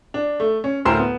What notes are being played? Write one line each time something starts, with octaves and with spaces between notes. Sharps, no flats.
D4
A3
C#4
D2 A2 A#4 C5 C6 E7
B3